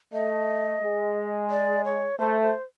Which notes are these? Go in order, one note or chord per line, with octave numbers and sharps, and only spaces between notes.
A3 D#5
G#3
D5
C#5
A3 C5
C5